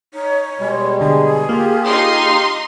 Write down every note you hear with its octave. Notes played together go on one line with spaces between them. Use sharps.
D#4 C#5
B2 G3 G#3
D3 G#4
A#3 F4 G4
D#4 C6